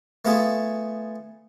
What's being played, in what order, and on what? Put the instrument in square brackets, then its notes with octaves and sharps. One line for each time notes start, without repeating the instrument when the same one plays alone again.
[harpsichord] A3 B3 F4 G#4 A4